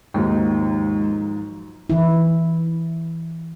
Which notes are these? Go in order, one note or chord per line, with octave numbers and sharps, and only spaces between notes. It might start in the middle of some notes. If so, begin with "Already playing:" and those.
D#2 G#2 F3 F#3 G#3
E3 E4